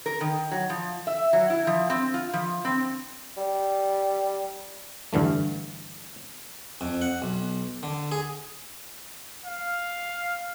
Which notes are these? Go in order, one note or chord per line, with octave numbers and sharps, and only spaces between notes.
A#4
D#3
F#3
F3
E5
F#3
E4
F3
C4
F4
F3
C4
G3
G2 D3 E3 A3
F2
F#5
B1
D3
G#4
F5